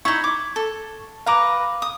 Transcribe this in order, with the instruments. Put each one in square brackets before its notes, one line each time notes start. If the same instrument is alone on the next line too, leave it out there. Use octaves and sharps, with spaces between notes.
[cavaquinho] D#4 E4 [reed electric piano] C#6 G#6
[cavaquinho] D6
A4
[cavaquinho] B4 A#5 [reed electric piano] F5 D6
[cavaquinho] D#6